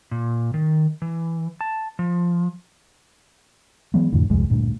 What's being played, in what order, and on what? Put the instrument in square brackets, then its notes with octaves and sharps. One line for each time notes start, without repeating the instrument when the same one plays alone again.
[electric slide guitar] A#2
D#3
E3
A5
F3
[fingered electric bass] E3 F#3 G#3 B3
F2 A2 D3 E3
D#1 C2 F2 G#3
D2 G2 A#2